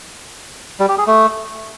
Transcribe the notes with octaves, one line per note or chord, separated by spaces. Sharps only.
G3
G4
G#4
A3